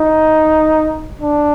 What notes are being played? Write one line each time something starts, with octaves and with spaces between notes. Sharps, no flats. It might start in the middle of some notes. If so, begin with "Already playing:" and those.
Already playing: D#4
D4